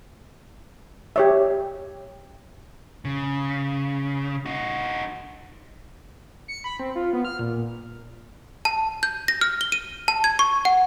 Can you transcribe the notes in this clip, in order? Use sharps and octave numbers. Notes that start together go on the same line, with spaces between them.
G4 C#5 E5
C#3
D#4 F#4
C#7
B5
C4
F4
B3
F6
A#2
A5
G6
A#6
F6
G7
D#7
A5
G#6
C#6
F#5